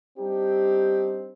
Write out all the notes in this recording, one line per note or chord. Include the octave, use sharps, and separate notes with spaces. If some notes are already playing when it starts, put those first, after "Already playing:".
G3 C4 D4 D#4 G4